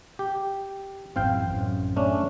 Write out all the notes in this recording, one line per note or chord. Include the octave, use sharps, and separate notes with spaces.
G4
A1 F#2 E3 C4 F5 G5
A1 F#2
A3 C#4 D4